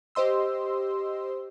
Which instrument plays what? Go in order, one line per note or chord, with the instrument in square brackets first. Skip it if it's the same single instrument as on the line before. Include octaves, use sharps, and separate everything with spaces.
[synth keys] G4 C5 D#5 C6 E6